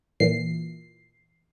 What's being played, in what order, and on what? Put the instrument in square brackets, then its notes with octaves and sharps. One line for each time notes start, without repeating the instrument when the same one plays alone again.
[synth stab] A#2 E3 C7